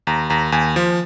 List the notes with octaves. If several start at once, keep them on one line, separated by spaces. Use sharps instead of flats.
D#2 A#5
D#2 A#5
D#2 G#5
F3